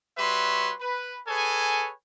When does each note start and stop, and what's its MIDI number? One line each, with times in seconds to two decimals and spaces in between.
0.18 0.73 55
0.18 0.73 66
0.18 0.73 71
0.18 0.73 73
0.18 0.73 76
0.18 0.73 84
0.80 1.19 71
1.27 1.91 68
1.27 1.91 69
1.27 1.91 71
1.27 1.91 73
1.27 1.91 80